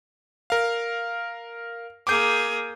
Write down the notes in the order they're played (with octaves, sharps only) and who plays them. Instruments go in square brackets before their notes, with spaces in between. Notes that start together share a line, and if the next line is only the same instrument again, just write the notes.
[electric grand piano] A#4 F5
[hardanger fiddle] A#3 G#4 [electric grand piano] D6 G6